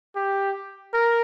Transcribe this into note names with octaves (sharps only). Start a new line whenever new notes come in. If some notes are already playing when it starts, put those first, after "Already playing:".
G4
A#4